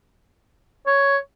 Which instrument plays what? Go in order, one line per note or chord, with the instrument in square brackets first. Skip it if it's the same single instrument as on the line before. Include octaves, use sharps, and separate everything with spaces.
[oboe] C#5